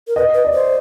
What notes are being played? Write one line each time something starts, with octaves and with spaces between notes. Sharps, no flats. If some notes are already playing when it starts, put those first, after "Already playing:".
A#4
B4 D#5
B4
D5
C5